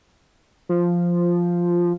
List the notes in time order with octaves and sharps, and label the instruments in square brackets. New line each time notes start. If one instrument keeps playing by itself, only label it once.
[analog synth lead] F3